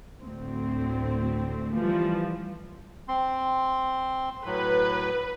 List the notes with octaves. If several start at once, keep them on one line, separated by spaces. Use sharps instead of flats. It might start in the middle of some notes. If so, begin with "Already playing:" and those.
D2 A2 C4
E3 F3 G3
C4 C6
A2 F#3 B4